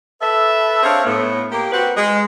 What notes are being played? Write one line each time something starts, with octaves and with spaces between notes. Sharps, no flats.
A4 B4 E5
C4 D4 G#4 C#5 E5 F5
A2 B3
A#3 G4
C4 F#4 B4
G#3